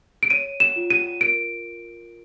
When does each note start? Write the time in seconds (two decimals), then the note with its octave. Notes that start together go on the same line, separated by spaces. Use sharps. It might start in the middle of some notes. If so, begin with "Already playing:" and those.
0.23 D7
0.30 C#5 D#7
0.60 E7
0.76 F4
0.90 D#7
1.21 A#4 D7